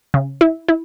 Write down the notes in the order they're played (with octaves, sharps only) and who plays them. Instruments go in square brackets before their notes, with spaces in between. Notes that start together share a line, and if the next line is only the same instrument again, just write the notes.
[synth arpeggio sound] C#3
E4
E4